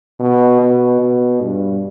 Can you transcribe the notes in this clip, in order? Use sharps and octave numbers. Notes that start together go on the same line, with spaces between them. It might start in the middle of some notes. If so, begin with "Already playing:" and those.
B2
B2
B2
G2